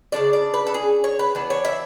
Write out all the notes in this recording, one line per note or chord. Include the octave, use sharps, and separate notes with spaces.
C#3 G#3 D4 D5
D5
B4
A4
G#4
C#5
B4
E3 B3 D4
C#5
E5